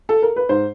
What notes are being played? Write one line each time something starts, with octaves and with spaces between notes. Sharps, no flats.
A4
A#4
B4
G#2 C5